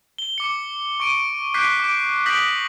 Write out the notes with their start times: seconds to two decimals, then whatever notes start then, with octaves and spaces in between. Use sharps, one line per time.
0.18 G7
0.38 D6 C#7
1.00 C#6 D7 D#7
1.54 D6 F#6 G6 B6 C7 D7
1.80 D6 D7
2.26 D#6 G6 A#6 B6 D7 F#7